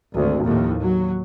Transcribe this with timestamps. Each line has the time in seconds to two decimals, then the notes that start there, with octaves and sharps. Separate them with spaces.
0.14 G#1 D2
0.46 D#2 A2 F3
0.83 F#3